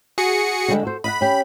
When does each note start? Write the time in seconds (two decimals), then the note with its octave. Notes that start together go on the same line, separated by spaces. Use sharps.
0.18 F#4 G#4 C#7
0.68 D3 G3 G#3
0.83 F#4 A4 C5
1.04 D#5 F5 F#5 B5
1.21 C#4 G4